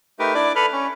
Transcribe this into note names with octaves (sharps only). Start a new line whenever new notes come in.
A3 D#4 G4 A#4 B4
D4 E4 D5 D6
A4 B4 B5 F6
C#4